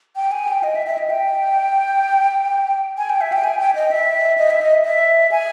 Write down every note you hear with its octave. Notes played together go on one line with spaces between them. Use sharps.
G5
G#5
G5
D#5
E5
E5
D#5
G5
G#5
G5
E5
G5
G#5
G5
D#5
E5
D#5
E5
D#5
E5
G#5